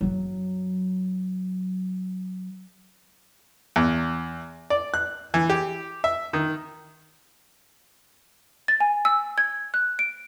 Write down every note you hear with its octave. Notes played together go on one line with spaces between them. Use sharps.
F#2 F#3
E2
D5
F#6
E3
G4
E5
D#3
A6
G#5
E6
G#6
F#6
D7